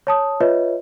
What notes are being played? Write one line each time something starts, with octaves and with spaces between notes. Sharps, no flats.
C#5 A5 D#6
F4 B4 C#5 D#5 E5